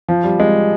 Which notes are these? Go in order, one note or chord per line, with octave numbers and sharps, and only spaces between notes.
F3
G3
G#3